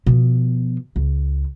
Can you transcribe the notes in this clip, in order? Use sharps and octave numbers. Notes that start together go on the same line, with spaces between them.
B2 F3
C#2